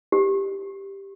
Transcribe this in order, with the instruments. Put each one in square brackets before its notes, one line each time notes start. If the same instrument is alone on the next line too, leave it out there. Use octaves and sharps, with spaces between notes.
[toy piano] G4